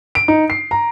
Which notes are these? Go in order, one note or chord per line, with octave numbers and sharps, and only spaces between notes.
D7
D#4
C7
A#5